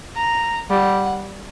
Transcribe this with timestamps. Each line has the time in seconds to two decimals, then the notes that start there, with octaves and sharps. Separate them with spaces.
0.16 A#5
0.70 G3 F#5